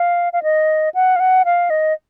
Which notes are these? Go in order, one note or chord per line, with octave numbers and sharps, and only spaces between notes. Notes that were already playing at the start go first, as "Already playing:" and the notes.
Already playing: F5
F5
D#5
F#5
F5
F#5
F5
D#5